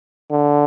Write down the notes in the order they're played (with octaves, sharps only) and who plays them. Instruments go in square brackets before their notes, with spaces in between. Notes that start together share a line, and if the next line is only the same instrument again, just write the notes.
[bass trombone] D3